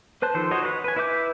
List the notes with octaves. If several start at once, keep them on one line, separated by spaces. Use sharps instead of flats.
B4 C5 A5 F#6
D#3 F3 A4 C5
F#4 C5 C#5 D#5
B4 C#5 D5 F#5
B4 G#5
E4 B4 E5 D6 G6